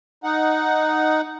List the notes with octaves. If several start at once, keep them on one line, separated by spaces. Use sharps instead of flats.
D#4 F#5